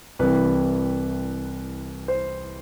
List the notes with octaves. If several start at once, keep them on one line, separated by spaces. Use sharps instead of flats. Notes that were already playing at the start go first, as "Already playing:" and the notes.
C2 C3 E3 B4
C5